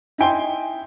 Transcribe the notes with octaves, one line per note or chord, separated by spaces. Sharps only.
D#4 E4 G5 G#5 C6